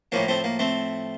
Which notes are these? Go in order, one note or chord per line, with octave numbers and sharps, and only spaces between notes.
A2 F3 A#3 C#4
A3 C4
A#3
A3 C4